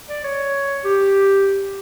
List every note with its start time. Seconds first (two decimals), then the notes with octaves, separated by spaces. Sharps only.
0.09 D5
0.24 C#5
0.85 G4